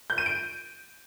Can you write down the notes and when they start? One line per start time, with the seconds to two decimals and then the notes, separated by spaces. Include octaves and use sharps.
0.10 G6
0.18 D#7
0.26 D7